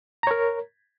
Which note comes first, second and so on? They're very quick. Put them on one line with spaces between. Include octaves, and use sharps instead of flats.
A#5 C#5 A#4